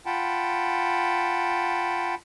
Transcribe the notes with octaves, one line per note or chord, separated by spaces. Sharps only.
F4 F#5 G5 A5 B5